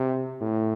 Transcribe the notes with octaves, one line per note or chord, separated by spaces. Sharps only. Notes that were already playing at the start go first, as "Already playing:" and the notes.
Already playing: C3
A2